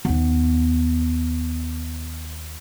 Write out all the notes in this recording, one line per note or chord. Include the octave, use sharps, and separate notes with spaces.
D#2 B3